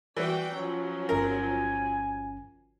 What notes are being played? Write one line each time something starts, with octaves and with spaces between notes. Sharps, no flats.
E3 F#4 D5 G5
F3 F#3 C#4
G1 C#4 A#4 G#5